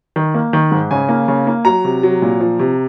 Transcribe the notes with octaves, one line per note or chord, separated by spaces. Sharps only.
D#3
A#3
D#3
G#2
C#3 G#5
A#3
C#3
A#3
F#3 A#5
C3
F#3
A#2
F3
C3